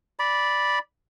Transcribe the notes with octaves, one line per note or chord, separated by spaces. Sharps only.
D5 B5